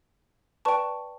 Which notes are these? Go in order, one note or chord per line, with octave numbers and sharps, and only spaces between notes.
B4 D5 G5 A5 C#6